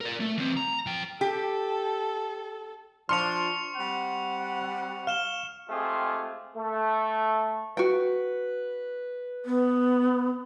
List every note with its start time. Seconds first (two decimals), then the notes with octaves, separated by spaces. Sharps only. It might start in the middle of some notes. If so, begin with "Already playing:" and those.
0.01 A#4 D5
0.20 A3
0.38 E3 C4
0.57 A#5
0.86 F3 G5
1.21 G4 A4
3.09 F3 D4 C6 C#6 F6 C#7 F7
3.76 G3 C4 F#5
5.07 F5 F6 E7 G7
5.70 G#3 A3 C4 F4 G4 G#4
6.57 A3
7.77 F#4 B4 G5
9.45 B3